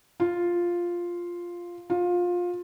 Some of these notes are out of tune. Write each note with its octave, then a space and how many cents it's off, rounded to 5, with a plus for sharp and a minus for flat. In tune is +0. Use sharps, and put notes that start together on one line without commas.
F4 +0
F4 +20